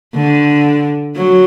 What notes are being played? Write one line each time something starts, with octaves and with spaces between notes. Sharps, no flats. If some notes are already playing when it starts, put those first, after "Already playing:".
D3
F#3